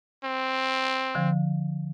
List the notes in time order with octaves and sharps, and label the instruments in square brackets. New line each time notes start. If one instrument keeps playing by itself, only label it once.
[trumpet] C4
[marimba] D3 F3